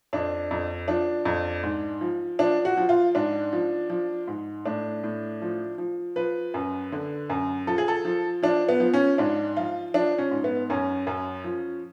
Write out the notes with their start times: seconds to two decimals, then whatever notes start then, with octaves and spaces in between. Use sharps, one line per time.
0.13 F2 D4
0.51 F2
0.88 F3 D4
1.25 F2
1.63 G#2
2.01 F3
2.39 F3 D4
2.65 F#4
2.77 F3
2.89 F4
3.15 G#2 D4
3.53 F3
3.90 F3
4.27 G#2
4.66 A2 D4
5.04 A2
5.42 F3
5.78 F3
6.16 F3 B4
6.54 F#2
6.92 D3
7.30 F#2
7.67 F3 A4
7.78 G#4
7.88 A4
8.05 F3
8.43 F3 D4
8.68 B3
8.80 F3
8.94 C#4
9.18 G#2 D4
9.57 F3 F4
9.94 F3 D4
10.18 C#4
10.31 G#2
10.44 B3
10.70 F#2 C#4
11.07 F#2
11.44 F3